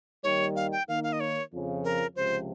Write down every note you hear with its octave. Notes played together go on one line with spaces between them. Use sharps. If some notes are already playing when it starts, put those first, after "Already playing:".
D#2 D#3 G3 C#5
F5
G5
D#3 A#3 D#4 A#4 F5
F5
D#5
C#5
F2 C#3 F3
A#4
C#2 C3 F3 C5